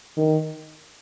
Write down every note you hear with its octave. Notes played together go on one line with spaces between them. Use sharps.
D#3